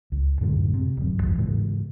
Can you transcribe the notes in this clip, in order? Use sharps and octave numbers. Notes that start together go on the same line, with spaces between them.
C#2
F#2 A2 D3 G#3
C3
D1 F#2
G#1 E2 G#2 F3
G#2 C#3 E3 G#3